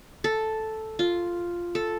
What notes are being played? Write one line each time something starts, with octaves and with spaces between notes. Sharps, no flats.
A4
F4
A4